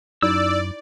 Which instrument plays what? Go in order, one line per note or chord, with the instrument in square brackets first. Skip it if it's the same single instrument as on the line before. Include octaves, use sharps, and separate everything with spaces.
[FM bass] F#2 [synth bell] D#4 E4 [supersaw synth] D5 [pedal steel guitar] E6